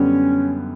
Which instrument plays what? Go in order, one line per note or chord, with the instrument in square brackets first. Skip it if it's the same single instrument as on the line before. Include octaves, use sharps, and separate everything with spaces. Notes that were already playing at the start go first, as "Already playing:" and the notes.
Already playing: [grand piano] F#2 D3 G3 B3 [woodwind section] C#4